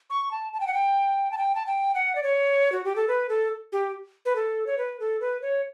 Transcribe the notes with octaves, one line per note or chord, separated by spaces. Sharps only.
C#6
A5
A5
G5
F#5
G5
A5
G5
A5
G5
F#5
D5
C#5
F#4
G4
A4
B4
A4
G4
B4
A4
C#5
B4
A4
B4
C#5